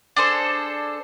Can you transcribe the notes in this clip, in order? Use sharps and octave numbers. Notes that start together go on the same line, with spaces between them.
D4 G#4 A4 C5